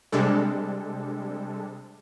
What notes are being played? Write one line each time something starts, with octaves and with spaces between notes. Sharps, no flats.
C3 G3 G#3 D4 A4